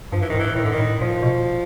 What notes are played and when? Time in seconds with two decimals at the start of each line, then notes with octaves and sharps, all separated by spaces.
0.12 G2 F3
0.21 E3
0.30 D#3
0.35 G#2
0.39 E3
0.56 A2 D#3
0.64 D3
0.72 D#3
0.79 A2
1.00 A#2 F3
1.22 B2